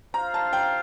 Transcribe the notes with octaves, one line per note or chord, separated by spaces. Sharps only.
F4 C5 F5 A#5
A5
G5